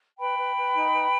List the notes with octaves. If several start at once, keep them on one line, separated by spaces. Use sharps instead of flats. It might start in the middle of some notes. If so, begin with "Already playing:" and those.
B4 G5 B5
B4
B4
D#4
B4